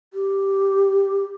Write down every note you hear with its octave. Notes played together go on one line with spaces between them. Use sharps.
G4